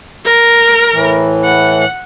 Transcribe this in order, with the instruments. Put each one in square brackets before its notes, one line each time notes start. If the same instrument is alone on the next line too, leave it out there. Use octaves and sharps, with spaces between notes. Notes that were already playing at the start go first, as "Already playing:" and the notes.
[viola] A#4
[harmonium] A2 E3
[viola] F#5